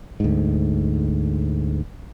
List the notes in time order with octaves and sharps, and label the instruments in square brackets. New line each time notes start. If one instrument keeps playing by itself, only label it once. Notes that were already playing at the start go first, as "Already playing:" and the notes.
[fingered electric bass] D2 G#2